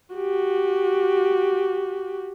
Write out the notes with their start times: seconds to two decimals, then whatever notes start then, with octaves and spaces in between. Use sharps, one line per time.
0.15 F#4 G4